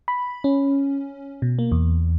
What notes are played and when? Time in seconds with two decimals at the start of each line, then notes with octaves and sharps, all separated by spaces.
0.08 B5
0.44 C#4
1.42 B2
1.59 A#3
1.72 E2